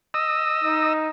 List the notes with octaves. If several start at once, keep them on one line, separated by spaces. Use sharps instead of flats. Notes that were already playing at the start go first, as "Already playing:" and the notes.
D#5 E6
D#4